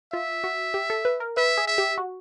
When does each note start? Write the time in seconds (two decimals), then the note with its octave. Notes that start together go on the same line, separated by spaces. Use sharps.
0.12 F4 E5
0.44 F#4
0.74 G4
0.90 A4
1.05 B4
1.20 A#4
1.37 B4 E5
1.58 G#4
1.67 E5
1.78 G4
1.98 F#4